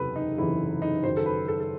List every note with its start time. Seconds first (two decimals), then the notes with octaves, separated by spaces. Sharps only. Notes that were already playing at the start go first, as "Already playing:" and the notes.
Already playing: F#1 E2 C3 E3 A4 B4
0.16 D#4
0.38 F#1 E2 C3 E3 E4
0.82 D#4
1.03 F#1 F#2 D#3 C5
1.17 A4
1.26 B4
1.48 A4
1.60 A4